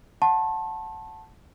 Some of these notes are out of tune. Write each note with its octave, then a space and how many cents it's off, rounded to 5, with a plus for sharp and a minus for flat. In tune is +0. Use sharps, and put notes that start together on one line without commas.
F#5 +0 A5 +0 C6 +45